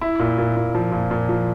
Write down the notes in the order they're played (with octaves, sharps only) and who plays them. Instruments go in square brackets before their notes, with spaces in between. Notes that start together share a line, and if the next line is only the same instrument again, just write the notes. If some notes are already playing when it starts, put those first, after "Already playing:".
[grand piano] E4
A#2
A#2
A#2
F3
A#2
A#2
F3